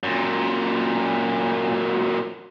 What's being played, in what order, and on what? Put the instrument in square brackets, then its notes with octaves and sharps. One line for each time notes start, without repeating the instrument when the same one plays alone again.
[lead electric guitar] F#2 A#2